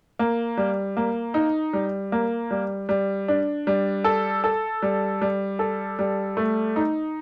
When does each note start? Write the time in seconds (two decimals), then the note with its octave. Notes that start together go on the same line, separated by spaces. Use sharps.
0.19 A#3
0.57 G3
0.97 A#3
1.34 D#4
1.73 G3
2.12 A#3
2.51 G3
2.89 G3
3.28 D4
3.67 G3
4.04 A4
4.44 A4
4.82 G3
5.22 G3
5.59 A4
5.99 G3
6.37 A3
6.76 D#4